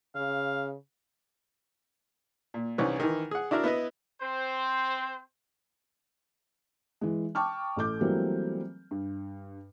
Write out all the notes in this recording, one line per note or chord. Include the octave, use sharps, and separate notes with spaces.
C#3 F5
A#2
C2 E3 C#4 D#4 B4
D#3 E3
G#4 F#5
D4 E4 F#4 A#4
B3 E4 B4 D#5
C4 C5
E3 G#3
G5 A5 C#6 D6 F6
A1 A4 D6 G6
E3 F#3 G3 A3 A#3 C4
G2